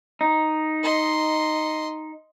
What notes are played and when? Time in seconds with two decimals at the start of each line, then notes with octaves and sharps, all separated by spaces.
0.21 D#4
0.83 D#5 C6